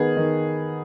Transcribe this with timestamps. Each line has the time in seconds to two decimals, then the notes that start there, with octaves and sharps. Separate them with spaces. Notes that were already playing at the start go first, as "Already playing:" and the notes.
Already playing: D#3 B3 G#4
0.17 D#3